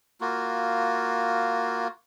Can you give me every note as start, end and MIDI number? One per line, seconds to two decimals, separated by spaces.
0.21 1.88 58
0.21 1.88 65
0.21 1.88 66